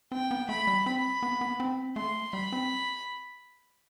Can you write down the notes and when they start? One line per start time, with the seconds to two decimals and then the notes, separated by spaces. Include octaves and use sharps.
0.12 C4 G5
0.31 B3
0.49 A3 B5
0.67 G3
0.86 C4 B5
1.23 B3
1.41 B3
1.60 C4
1.96 A3 C6
2.33 G3 B5
2.52 C4